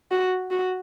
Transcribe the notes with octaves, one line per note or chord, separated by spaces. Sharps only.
F#4
F#4